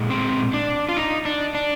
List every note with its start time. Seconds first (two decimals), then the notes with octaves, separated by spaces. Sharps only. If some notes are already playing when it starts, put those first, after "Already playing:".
Already playing: A#2 G#3
0.10 C4
0.54 D4
0.89 F4
0.97 D#4
1.25 D4
1.55 D4